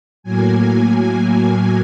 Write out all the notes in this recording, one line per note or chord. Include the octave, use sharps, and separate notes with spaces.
A2 F#3 A#3 G#5